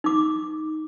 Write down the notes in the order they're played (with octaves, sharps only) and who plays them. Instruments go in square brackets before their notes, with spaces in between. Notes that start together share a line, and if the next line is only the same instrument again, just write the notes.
[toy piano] D#4 D6